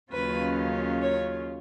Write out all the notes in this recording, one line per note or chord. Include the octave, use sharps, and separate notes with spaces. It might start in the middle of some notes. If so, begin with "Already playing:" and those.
D#2 C#3 F#3 C#4 F4 B4
C#5